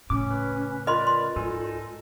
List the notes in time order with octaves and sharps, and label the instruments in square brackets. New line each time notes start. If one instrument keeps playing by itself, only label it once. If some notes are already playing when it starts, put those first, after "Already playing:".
[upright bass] A2 C#3 [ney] C#4 [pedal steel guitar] D6
[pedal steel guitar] B4
[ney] F4 [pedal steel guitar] A#4 B4 D5 [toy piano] D#5 B5 C6
[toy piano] C6
[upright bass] G#2 [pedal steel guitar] D#4 A4 G#5